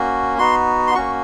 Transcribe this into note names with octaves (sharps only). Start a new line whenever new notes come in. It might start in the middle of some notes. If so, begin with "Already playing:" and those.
Already playing: A#3 C#4 F#4
B3 D#4 F#4 C6
C6
A#3 C#4 F#4 C#6